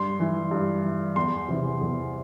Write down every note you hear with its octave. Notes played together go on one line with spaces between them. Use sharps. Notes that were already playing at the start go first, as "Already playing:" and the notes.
Already playing: G2 C6
E3
G2
E3
E2 C6
C3 E3
E2